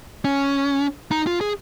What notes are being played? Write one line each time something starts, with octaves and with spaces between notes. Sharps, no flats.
C#4
D#4
F4
G#4